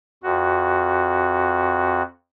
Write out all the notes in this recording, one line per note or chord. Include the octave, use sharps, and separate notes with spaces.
F2 F#4